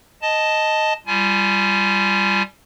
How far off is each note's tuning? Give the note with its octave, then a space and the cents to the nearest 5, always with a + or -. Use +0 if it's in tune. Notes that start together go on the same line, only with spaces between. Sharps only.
D#5 +0 A5 +0
G3 +0 F4 -20 G#5 +25